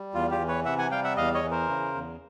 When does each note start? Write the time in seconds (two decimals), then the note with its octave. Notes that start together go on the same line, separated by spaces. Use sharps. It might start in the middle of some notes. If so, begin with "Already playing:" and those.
Already playing: G3
0.14 E2 F4
0.31 F4 G4
0.39 E3
0.48 B4 C#5
0.65 C3 E5 F#5
0.78 F#5 G#5
0.91 G3 F5 G5
1.04 E5 F#5
1.17 E2 D#5 F5
1.34 C#5 D#5
1.43 E3
1.51 A#4 C5
1.69 C#3
1.94 E2